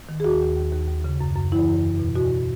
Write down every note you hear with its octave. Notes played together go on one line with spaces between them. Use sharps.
D#3
G#4
D#2 F#4
D#2
D#2
D#2
D#2
C#3
F#2
F#2
E3 E4
F#2
E2
B2
B2 F#4